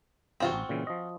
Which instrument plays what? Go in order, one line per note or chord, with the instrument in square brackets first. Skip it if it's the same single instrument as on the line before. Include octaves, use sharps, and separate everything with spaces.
[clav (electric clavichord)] G2 C3 E3 [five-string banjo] C4 F4 F#4
[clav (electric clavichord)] A1
A#2 C#3 E3
F3 D#5